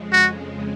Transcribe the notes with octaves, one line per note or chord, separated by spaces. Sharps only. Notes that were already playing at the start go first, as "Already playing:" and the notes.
Already playing: F2 C#3 G#3
F#4